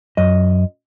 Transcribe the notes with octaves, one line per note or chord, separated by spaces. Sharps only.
F#2 D#5